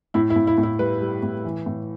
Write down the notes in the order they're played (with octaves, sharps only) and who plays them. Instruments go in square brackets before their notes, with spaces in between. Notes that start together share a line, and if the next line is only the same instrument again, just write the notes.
[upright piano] A2 E4
E4
A2
E4
A2
E4
G3 B4
G3
A2
E3
A2